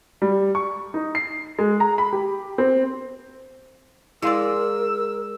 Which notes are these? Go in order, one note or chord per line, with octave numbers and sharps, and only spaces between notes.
G3
C#6
D#4
C7
G#3
A#5
B5
G4
C4
G#3 E4 A#4 D5 F5 C6 E6